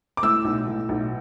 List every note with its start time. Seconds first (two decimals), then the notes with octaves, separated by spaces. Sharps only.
0.17 D6
0.23 A2 E6
0.45 B1
0.67 A2
0.89 B1